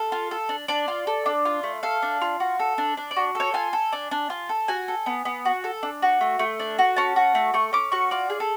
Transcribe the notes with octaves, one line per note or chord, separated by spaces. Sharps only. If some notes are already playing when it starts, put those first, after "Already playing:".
Already playing: A4 F5
F4
A4
D4
D4 D5
F4
A4
D4
F4
A3
A4 F5
D4
F4
F#4
A4
D4
D4
D5
F#4
A4 C#5
F4 G#5
A4
D4
D4
F4
A4
F#4 G#5
A4
B3
B3
F#4
A4
D4
F#4
A3
A3
D4
F#4
C#4 A5
F#4
A3
A3 C#6
C#4 D6
F#4 C#6
F4 D5
G#4
A4